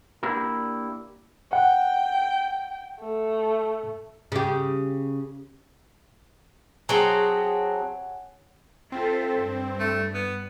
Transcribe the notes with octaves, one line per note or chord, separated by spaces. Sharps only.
A#3 D4 E4 G4 A#4
F#5 G5
A3
C#3 G4
F#3 C4 G#4 C#5 F#5 G#5 A5
C4 F4 A4 E5
G2
A3
B3